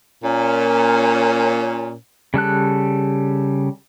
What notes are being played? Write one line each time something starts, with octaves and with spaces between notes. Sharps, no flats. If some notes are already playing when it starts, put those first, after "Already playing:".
A#2 C#4
C#3 G3 A4 F#6